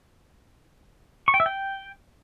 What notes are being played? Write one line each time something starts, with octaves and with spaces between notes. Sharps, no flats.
C#6
G5
E5
G5